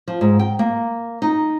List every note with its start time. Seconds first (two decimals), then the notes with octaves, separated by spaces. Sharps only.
0.08 F3
0.21 G#2
0.39 G5
0.59 A#3
1.22 D#4